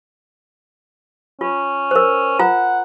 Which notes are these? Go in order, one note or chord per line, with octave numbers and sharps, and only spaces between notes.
C#4 F4
A#4 C5
F4 F#5 G#5 A#5